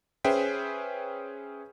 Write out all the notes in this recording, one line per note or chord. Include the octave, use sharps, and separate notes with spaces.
C#4 G#4 B4 C5 E5 G5